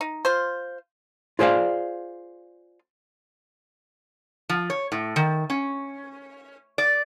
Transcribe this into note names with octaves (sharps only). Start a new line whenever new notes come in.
D#4
F4 C5
F4 G#4 C5 D5 F5
F3
C#5
A2
D#3
C#4
D5